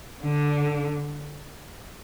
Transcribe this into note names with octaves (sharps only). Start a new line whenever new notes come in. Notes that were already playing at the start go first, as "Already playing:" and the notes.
D3